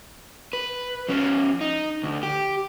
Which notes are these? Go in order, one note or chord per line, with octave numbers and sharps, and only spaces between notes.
B4
F3 C#4
D#4
D2
G4